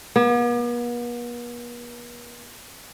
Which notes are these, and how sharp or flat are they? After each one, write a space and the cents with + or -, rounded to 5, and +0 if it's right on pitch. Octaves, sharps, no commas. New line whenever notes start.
B3 -45